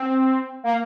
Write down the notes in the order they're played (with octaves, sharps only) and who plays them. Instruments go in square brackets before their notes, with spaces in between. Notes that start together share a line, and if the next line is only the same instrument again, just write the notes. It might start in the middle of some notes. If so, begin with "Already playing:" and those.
Already playing: [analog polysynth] C4
A#3